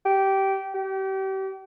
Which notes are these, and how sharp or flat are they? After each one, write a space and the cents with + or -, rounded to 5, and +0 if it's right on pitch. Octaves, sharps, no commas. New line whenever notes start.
G4 -15
G4 -35